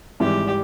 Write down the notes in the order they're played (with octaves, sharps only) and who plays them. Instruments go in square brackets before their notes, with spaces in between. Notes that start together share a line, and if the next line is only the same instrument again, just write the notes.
[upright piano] G#1 G#2 E3 G3 [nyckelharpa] G4